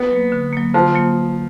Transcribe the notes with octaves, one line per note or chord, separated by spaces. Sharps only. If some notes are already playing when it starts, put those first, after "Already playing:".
Already playing: B3
F#3 A#3
D3
F#3 A#3
D3 F3
F#3 A#3